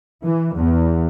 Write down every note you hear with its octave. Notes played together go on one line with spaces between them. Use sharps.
E3
E2